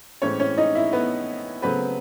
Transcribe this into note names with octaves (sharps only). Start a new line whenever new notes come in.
A2 E3 G#3 C4 C#4 C#5
C#4 C#5
D#4 D#5
E4 E5
B3 B4
C#3 F#3 A3 B3 C4 B4